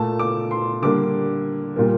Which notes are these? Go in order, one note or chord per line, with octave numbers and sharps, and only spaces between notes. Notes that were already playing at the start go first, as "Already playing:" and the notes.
Already playing: A#2 A3 A5
D6
C6
D3 G3 A#3 D6
A#2 G3 A#3